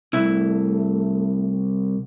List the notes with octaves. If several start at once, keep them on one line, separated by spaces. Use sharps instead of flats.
C2 A3 E4